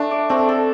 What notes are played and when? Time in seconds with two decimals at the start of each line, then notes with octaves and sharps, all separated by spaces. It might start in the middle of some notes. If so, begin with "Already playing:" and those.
Already playing: A3 D4
0.11 D5
0.29 A3 C4
0.49 A4